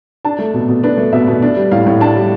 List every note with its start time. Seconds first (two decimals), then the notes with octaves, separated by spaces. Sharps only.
0.25 D4 A5
0.39 A3
0.54 B2
0.69 B2
0.83 D4 B4
0.98 A3
1.12 B2 E5
1.27 B2
1.42 D4
1.56 G3
1.72 A2 F5
1.86 A2
2.01 D4 A5
2.16 G3